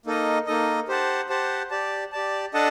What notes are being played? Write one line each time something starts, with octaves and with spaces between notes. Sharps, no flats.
A#3 D#4 A4 D#5
A#3 D#4 A4 D#5
G4 C5 F#5 A5
G4 C5 F#5 A5
G4 D5 A5
G4 D5 A5
D4 A4 D#5 F#5 A5